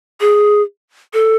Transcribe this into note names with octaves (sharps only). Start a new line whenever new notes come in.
G#4
A4